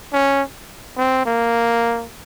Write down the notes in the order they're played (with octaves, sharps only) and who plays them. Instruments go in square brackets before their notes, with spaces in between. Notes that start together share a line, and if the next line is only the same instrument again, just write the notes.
[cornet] C#4
C4
A#3